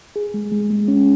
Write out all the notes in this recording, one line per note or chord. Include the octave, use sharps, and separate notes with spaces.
G#4
G#3
G#3
G#3
C#4